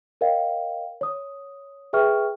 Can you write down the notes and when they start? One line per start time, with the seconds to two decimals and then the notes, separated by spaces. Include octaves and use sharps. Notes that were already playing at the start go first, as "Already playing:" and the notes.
0.21 A#4 C#5 D#5 F5 G5
1.01 C#5 D#6
1.93 G#4 B4 E5 G5 C#6 F6